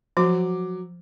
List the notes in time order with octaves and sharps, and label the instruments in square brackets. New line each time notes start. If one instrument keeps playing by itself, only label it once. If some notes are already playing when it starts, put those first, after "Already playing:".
[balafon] F3 [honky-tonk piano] F#3 D6